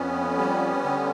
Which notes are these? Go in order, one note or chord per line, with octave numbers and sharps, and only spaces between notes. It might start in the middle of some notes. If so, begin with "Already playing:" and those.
Already playing: F2 B3 C#4
G3
D3